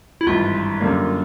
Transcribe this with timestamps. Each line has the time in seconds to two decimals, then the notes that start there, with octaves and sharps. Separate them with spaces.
0.21 E4
0.26 G#1 G2 E3 F4
0.80 F#2 D3 G3 A#3